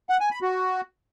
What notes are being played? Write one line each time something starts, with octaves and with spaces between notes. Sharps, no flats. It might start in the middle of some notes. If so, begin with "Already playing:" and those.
F#5
G#5
B5
F#4